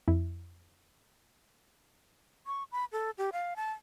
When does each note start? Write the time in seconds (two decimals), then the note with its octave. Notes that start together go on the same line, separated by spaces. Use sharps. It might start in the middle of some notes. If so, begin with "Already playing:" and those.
0.08 F2 E4
2.47 C#6
2.72 B5
2.92 A4
3.18 G4
3.33 F5
3.56 A5